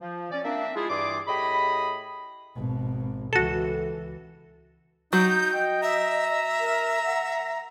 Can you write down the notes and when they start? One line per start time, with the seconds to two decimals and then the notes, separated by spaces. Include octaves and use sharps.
0.01 F3
0.31 C#4 D5
0.45 A#3 C4 D4 E5
0.76 G#3 E4 F4 G#4
0.90 G2 E3 G#4 D5 C6 D6
1.28 A2 G4 G#4 D#5 B5
2.55 G#1 B2
3.33 C#2 E3 F#4 A4
5.13 F#3 D#4 G6
5.53 D#5 G5
5.82 E5 A#5
6.60 A#4
7.05 F#5